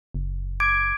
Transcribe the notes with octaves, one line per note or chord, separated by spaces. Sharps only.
F#1
D6 G#6 D7